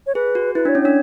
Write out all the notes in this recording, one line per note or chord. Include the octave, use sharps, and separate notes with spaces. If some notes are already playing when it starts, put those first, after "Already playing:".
C#5
G#4 B4
F#4
E4 B4
D4
C#5
C#4
D4 C#5